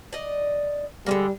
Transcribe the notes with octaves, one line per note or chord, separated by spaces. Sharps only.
D5 D#5
D3 G3 G#3 A#3